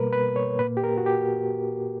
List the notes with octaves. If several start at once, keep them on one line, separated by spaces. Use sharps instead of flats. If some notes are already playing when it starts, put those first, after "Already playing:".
Already playing: B2 G3 A#3 A#4 B4
B4
C#5
A#2 A#3 B4
G4
A#4
F#4
G4